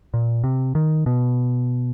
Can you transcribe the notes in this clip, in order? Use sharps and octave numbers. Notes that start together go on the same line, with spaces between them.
A#2
C3
D#3
B2